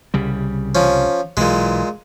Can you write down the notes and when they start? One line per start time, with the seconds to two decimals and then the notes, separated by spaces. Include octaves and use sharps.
0.14 C2 C#3 G3
0.75 F3 C#4
1.37 B1 A#2 E3 G#3